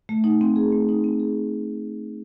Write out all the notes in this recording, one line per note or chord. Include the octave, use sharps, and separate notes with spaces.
A3
D#4
C4
G#4
A3
D#4
C4
G#4